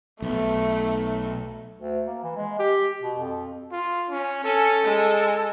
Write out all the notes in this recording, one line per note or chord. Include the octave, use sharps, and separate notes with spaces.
B1 A3
D2
A#3
E3
G#3
G4
B2
F2
F4
C#4
C#4 A4
G#3